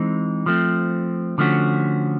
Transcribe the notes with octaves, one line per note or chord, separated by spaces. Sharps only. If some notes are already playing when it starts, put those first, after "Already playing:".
Already playing: E3 G#3 C4 D#4
F3 A3 C4
D3 F3 A3 C#4 F#4